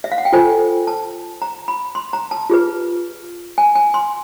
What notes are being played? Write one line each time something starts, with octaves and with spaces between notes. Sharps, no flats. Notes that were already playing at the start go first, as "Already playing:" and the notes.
E5
F5
F#5
G5
F4 A4 C5 G#5
A5
A#5
B5
C6
A#5
A5
F4 G#4 B4
G#5
G#5
C6